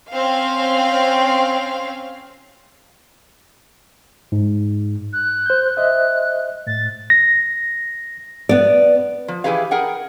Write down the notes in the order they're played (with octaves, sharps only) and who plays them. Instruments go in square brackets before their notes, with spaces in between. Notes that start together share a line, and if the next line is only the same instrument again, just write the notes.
[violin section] C4 C#4 F5
[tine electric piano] G#2
[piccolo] F#6
[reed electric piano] C5 G6
[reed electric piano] C5 D#5 E5 [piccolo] F#6
[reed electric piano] A2 [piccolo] A6
[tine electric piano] A#6
[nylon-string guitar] B3 D5
[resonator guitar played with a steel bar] F3
E3 E4 G4 G#4 B4 F5
G#4 A#4 F#5 G5